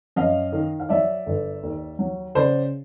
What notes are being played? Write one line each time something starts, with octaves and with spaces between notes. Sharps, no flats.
F#2 D#5 F5
D#3
F5
F#3 D5 E5
G1
D#2
F#3
C#3 C5 D5